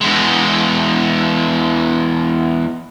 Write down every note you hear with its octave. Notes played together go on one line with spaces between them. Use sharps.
E2 G#3